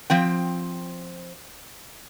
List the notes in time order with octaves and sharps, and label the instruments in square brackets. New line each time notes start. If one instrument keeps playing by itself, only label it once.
[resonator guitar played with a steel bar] F3 C4 G5